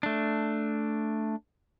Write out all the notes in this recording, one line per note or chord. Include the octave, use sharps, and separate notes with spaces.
A3 D4